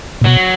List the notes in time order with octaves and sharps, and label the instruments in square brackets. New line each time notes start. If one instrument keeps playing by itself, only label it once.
[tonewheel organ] A#2
[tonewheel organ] B2 [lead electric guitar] F#3